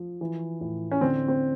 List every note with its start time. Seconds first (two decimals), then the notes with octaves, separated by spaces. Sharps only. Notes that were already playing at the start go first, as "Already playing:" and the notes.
Already playing: F3
0.21 E3
0.61 A2
0.91 C#4
1.01 D3 C4
1.28 C4